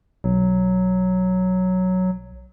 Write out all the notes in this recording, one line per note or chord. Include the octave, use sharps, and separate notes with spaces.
B1 F#3